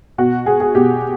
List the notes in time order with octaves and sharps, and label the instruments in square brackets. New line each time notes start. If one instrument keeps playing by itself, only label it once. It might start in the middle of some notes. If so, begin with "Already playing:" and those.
[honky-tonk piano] B2 F#4
G#4
G#4
B2 G4